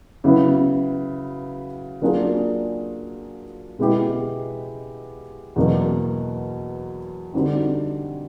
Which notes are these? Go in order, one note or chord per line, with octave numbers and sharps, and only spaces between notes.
C#3 F#3 B3 E4
F#3 A#3 D4 F4 G#4
B2 G#3 B3 E4 G4
E2 B2 F#3 A#3
D3 G3 C4 D#4 F#4